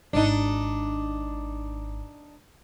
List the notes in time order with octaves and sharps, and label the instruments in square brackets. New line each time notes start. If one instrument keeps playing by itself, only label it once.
[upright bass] G#1 [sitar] D4 D#4